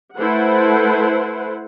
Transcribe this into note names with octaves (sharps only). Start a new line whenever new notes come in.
A3 E4 A4 B4 C5 F#5